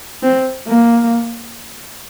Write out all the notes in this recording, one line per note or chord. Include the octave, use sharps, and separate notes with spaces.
C4
A#3